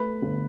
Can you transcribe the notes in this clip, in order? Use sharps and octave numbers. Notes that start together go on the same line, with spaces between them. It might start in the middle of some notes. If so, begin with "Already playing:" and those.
Already playing: A3 B4 B5
G1